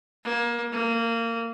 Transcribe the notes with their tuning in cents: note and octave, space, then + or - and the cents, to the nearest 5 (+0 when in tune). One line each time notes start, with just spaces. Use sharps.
A#3 +25
A#3 -20